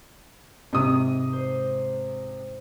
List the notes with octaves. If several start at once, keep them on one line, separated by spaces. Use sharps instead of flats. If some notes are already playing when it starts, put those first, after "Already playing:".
G#2 C3 D#6
C5